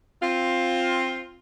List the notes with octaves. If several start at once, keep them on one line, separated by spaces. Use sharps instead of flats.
C4 F4